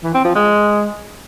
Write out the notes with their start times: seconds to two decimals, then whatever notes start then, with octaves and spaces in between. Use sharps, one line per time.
0.03 E3
0.14 C4
0.25 F3
0.35 G#3